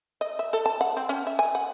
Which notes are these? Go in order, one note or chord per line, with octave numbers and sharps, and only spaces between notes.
D#5
E5
A4
A5
F#5
C4
C#4
E5
G#5
F#5